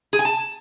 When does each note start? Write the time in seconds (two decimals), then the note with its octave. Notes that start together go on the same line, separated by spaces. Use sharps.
0.13 G#4
0.19 G#5
0.25 A5